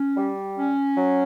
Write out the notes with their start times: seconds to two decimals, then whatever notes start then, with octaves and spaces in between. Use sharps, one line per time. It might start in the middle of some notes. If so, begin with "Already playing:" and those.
Already playing: C#4
0.17 G3
0.58 C#4
0.98 F#3